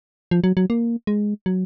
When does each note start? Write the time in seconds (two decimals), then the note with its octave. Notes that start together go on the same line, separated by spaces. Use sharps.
0.31 F3
0.44 F#3
0.57 F#3
0.70 A#3
1.07 G#3
1.46 F#3